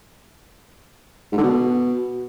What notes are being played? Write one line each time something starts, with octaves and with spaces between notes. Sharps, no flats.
G#2
D3
B2